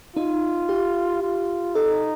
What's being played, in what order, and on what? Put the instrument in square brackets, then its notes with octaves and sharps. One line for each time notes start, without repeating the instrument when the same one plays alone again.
[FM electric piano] D#4 [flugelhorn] F4
[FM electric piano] G4
[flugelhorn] F4
[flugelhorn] D#4 [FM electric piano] A4